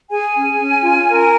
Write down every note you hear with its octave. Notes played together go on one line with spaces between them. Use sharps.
G#4 G#5
C#4
C#4
F4
A#4